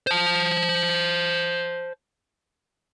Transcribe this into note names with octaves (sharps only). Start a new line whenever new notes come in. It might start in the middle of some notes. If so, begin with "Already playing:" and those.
C5 A5